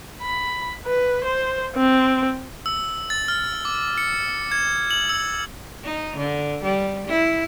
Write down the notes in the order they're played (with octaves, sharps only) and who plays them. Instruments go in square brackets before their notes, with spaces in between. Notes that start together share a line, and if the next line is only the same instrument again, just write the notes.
[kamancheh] B5
B4
C5
C4
[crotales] E6
A6
F6
D6
C#7
G#6
F#7
E6
[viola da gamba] D#4
D3
G3
E4